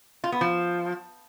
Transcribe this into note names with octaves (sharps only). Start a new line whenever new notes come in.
F4
B3
F3